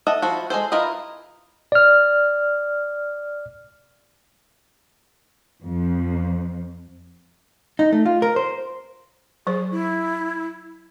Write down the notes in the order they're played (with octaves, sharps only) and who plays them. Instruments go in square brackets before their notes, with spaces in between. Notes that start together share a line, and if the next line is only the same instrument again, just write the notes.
[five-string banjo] A4 D#5 E5 F#5
F3 E4 F#4
G#3 G#4 A4 C5
E4 F4 A#4 B4 D#5
[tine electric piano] D5 F6
[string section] F2
[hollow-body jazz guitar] D#4
A3
F4
A#4
C5
[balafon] F#3 C5 [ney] G#4
[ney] E4